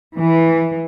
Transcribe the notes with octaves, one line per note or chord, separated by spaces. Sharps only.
E3